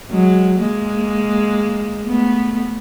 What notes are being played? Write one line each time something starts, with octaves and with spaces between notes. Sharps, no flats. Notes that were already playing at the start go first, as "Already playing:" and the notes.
F#3 G#3
G#3 A#3
A3 B3